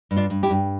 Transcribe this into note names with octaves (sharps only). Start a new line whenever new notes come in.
G2
D4 F4
G2
E4 G4
G2